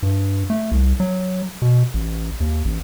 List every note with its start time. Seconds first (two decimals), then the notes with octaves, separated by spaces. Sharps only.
0.03 G2
0.50 A3
0.72 C2
1.00 F#3
1.62 B2
1.94 A1
2.40 D#2
2.65 A1